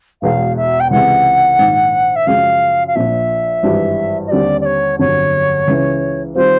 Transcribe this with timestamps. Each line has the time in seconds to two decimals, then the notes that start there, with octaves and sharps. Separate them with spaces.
0.22 E1 E2 B2 G#3 F5
0.56 E5
0.80 G5
0.91 C#2 C3 E3 G#3 F#5
1.59 A#1 G#2 D#3
2.16 E5
2.26 F#2 C#3 F3 G#3 F5
2.87 F5
2.95 A#1 A#2 F3 E5
3.63 G#1 G2 E3 G3
4.27 D#5
4.31 D#2 D3 G3 C4 D5
4.61 D5
4.65 C#5
4.99 G1 F2 D3 F#3 C#5
5.68 C#2 C#3 E3
6.35 D#3 G3 C4 F4 C5